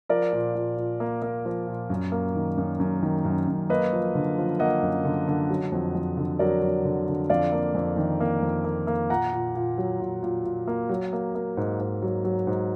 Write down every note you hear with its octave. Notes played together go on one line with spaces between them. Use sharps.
F3 A#4 D5
A#2
A#2
A#2
A#3
A#3
F3
A#2
F#2
A#3
D#3
F#2
F#2
D#3
F#2
F#2
A#3 B4 D#5
F3
D3
F3
A#3 D#5 F#5
F#2
D3
D3
F#3
F2
F2
D3
F#3 A#4 D5
F#3
D3
D3
F2 D5 F5
A#3
F2
D#3
A#3
F2
A#3
A#3
A#2 F#5 A#5
A#2
A#2
F#3
A#2
A#2
A#2
A#3
F#3
A#3
A#3
G#2
G#2
F#3
F#3
G#2